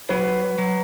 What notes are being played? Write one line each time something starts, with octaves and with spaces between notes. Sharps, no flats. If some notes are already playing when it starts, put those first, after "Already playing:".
F#3 B4
F#3